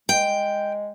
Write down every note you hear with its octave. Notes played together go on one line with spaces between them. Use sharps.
G#3 G5